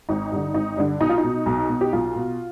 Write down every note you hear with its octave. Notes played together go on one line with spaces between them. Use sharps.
G#1 D#4
G2 D3
G#1 D#4
G2 D3 D4
B1 D#4
F4
D#4
B2
B1
B2
G4
B1 F4
B2